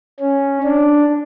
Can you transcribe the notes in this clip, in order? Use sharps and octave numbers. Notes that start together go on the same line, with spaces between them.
C#4
D4